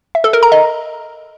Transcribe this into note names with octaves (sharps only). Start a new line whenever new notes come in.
E5
A4
A#4
A#5
D#5